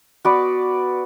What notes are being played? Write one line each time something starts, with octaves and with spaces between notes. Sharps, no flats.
B3 F#4 B4 D5